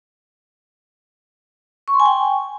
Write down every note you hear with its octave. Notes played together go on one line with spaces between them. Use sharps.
C#6
C6
G#5
G5